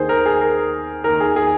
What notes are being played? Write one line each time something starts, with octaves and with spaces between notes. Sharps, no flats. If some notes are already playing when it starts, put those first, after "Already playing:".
Already playing: D#2 D#3 G#4 C5
A#4
G#4
A#4
D#2 D#3 A#4
G#4
G#4